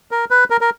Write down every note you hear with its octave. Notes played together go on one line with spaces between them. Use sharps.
A#4
B4
A#4
A#4